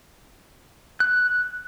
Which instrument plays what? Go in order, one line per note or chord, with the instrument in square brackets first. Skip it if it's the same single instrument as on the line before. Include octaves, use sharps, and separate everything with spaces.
[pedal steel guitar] F#6